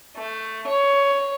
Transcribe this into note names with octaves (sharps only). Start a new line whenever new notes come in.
A3
C#5